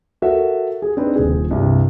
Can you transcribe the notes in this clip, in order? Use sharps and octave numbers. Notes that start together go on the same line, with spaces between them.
F#4 A4 A#4 E5
G#4
C4 D4 D#4 B4
D#1 G#4
C2 G2